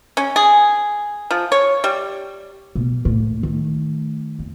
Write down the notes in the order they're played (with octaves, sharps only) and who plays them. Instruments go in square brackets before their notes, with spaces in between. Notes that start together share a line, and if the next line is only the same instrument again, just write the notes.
[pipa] C#4
G#4
F3
C#5
G3
[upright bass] B2
A2 A#3
D#3 A3
F2